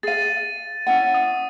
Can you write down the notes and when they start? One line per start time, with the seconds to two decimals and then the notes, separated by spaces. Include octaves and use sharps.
0.03 G#4 F5 A6 D#7
0.87 C#4 E4 F#5
1.14 D#6